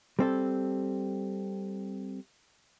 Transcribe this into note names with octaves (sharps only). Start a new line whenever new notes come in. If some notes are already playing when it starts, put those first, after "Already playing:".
G3 C4 A4